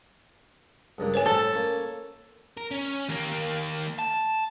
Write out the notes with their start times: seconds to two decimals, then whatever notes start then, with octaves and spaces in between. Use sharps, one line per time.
0.98 C#2 G2 A#3
1.14 C5 C#5 G#5
1.26 A2 A4
1.53 A#3 C#4
2.58 A#4
2.71 C#4
3.08 D#2 A#3
3.99 A5